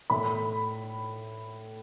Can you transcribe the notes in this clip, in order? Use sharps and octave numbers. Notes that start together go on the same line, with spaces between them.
A2 A3 B5